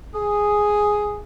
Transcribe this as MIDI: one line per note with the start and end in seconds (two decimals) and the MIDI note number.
0.14 1.20 68